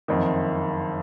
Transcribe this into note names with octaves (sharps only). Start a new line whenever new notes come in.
F#1 F2 D#3